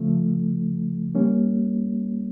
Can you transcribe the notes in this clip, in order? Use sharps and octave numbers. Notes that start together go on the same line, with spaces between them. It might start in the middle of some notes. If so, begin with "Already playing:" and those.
Already playing: C#3 F3 A3
G3 A#3 C#4